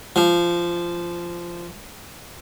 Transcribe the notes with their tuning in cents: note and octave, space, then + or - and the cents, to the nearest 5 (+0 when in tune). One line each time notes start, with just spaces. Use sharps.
F3 -15